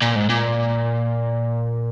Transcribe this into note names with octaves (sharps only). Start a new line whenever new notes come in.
A#2
G#2
A#2